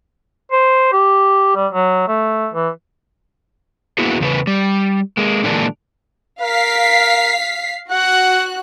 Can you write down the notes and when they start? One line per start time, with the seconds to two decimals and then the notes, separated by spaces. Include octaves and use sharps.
0.52 C5
0.93 G4
1.56 G3
1.73 F#3
2.08 A3
2.53 E3
3.98 A#3 B3 E4 F#4 G#4
4.20 E2 C#3 E4 B4
4.47 G3
5.17 G#3 A#3
5.43 A#2 D3 E3 G#3 A#3 D4
6.42 A#4 F5 B6 C7
7.91 F#4 F#5 F#6